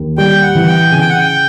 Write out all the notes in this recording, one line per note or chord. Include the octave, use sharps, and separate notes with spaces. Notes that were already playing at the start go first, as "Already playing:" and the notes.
Already playing: D#2
G3 G5
F#5
E3
G5
C#3 G#5
G5
F#5
G5